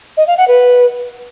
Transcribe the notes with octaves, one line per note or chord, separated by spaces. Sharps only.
D#5
F5
F#5
B4